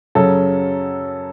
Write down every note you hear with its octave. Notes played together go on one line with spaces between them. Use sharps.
F#2 C#3 F#3 C#4 A4